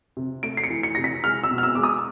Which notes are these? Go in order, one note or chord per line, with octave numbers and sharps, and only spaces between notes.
C3
A3 D7
C7
C#7
E3
C#7
C3 A#6
B6
G#3 F6
E6
B2
F6
E6
G#3 D6
D#6